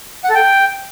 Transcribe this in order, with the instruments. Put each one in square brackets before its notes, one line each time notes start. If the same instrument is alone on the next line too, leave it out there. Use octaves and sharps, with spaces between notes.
[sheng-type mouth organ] F#5
A4
G5